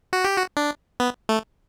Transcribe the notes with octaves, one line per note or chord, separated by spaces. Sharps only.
F#4
G4
F#4
D4
B3
A3